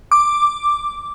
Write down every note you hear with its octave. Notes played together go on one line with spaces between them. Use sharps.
D6